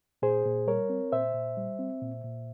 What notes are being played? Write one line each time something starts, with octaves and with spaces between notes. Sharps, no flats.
A#2 G#4 C5
A#2
G3 A#4 C#5
C4
A#2 C5 E5
A#2
G3
C4
A#2
A#2